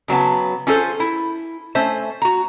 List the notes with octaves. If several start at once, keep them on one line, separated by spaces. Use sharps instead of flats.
C#3 F#3 B3 A5
C#4 F4 G#4 A4 C5
E4
A3 C#4 C5 E5
F#4 A#5